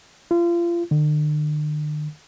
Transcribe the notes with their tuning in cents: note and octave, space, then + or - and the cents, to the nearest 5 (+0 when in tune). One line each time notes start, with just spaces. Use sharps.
F4 -30
D3 +45